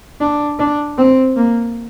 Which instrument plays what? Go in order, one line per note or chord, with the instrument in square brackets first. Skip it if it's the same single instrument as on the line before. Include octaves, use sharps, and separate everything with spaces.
[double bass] D4
D4
C4
A#3